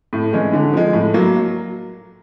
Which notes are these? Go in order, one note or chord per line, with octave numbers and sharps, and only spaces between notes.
A2
E3 G#3 C#4
D3
F3 G#3
A2
F#3 A#3